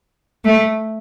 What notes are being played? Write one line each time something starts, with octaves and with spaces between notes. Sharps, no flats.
A3